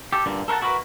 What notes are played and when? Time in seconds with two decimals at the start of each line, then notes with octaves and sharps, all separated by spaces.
0.13 G4 A4
0.26 G2 A#2 D3
0.48 A4 A#4 C5 F#5 A5
0.61 E4 F#4 G#4 A#4 B4